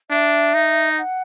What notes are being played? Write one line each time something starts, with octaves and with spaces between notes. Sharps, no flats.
D4 E5
D#4
F#5